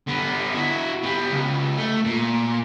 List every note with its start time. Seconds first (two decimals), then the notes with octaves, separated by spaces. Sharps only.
0.07 D3 B3
0.55 E4 F#4
1.03 G3 B3
1.32 C#2
1.78 A3
2.04 A#2